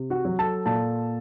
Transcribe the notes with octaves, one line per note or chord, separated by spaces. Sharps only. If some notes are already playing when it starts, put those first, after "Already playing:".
Already playing: C3
F#4 F#5
F#3
A4 A5
A#2 A4 A5